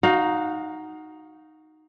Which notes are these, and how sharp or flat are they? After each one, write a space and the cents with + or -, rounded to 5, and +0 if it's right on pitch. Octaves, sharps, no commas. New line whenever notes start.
D#4 +0 F#4 +0 F5 +25